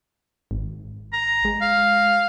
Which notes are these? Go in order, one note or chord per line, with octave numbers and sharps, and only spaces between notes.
G#1
A#5
G#3
F5